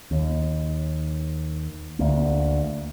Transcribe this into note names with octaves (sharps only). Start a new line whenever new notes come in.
D#2
D2 A#3